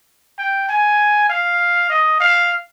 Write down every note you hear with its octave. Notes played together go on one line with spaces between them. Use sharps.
G5
G#5
F5
D#5
F5